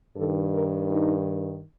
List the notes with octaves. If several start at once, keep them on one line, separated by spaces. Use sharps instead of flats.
G2 D#3 A4
A#4
D#4